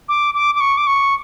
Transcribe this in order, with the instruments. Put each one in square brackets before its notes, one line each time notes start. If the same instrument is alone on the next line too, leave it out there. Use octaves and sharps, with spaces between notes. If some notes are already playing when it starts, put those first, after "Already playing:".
[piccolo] D6
D6
D6
C#6
D6
C#6